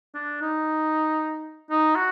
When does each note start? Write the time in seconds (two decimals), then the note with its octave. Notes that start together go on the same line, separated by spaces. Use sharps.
0.14 D4
0.41 D#4
1.70 D#4
1.96 F#4